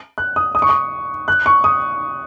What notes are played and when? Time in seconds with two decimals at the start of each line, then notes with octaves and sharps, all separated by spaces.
0.18 F#6
0.36 D#6
0.55 D#6
0.62 C#6
0.69 D#6
1.28 F#6
1.46 C#6
1.64 D#6